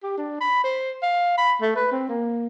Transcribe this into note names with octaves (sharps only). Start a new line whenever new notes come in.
G4
D4
B5
C5
F5
B5
A3
B4
C4
A#3